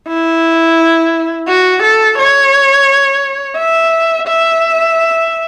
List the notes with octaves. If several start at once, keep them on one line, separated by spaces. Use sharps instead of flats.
E4
F#4
A4
C#5
E5
E5